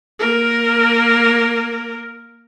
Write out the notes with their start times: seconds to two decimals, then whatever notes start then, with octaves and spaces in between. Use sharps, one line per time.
0.19 A#3 A#4